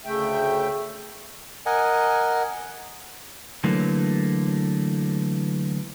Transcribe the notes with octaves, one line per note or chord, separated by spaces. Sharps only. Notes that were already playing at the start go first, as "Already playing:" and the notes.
D2 C#3 A3 E5 G5
A#4 D#5 F#5 G#5
D3 E3 F#3 A3 A#3